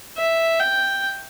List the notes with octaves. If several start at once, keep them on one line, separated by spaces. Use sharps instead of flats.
E5
G5